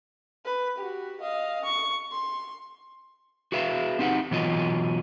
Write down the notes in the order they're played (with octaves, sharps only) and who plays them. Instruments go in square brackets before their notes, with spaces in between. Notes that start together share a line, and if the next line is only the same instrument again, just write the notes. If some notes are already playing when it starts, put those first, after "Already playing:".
[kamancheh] B4
F#4 G4
D#5 F5
C#6
C6
[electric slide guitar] F#4 G#4 B4 E5 F5
C4 D#4 G4 F#5
B2 E3 F#3 F4 D#5